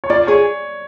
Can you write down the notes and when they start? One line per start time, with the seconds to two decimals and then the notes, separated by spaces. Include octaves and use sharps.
0.04 C#5
0.10 F4 D5
0.27 G#4 C#5